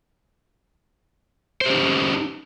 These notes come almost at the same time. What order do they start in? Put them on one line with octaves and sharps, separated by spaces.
C5 G4 C#4 D#4